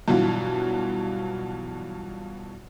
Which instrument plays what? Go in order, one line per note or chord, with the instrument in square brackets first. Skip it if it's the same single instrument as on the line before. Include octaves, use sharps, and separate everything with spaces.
[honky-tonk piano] G2 B2 E3 F#3 F4 F#4